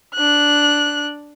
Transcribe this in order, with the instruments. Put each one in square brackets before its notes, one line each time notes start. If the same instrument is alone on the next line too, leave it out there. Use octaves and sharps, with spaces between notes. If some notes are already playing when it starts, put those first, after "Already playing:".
[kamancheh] D4 F#6